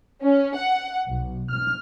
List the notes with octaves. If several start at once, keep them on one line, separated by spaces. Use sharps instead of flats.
C#4
F#5
B1
F6